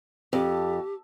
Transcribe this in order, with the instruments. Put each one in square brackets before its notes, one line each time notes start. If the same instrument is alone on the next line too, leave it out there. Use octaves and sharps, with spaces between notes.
[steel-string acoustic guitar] F2 [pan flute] G4